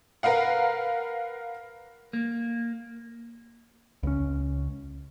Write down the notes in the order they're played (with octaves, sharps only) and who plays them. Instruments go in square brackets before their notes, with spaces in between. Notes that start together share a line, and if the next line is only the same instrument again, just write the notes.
[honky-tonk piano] A#4 B4 F5 F#5
[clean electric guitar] A#3
[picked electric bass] C#2 C#4